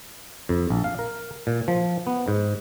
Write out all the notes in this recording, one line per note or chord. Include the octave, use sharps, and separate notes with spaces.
F2
A#1
F5
A#4
A#2
F3
B3
G#2